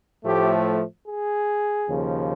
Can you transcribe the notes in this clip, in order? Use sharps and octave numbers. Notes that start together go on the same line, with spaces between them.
A2 F3 A3 G4
G#4
D#2 C#3 F3